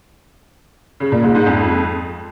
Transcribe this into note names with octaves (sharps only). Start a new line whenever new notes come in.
C#3
A#2
G#2
G#2
F2